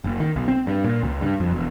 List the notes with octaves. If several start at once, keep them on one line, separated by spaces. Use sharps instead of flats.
F#1
D#3
B1
C4
G2
A#2
C#2
G2
F2
E1